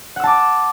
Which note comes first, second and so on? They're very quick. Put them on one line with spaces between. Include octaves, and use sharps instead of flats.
F#5 E6 A5 D6